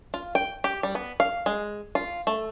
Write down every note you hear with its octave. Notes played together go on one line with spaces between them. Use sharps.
F4
G5
G4
G3
B3
F5
G#3
F4
A3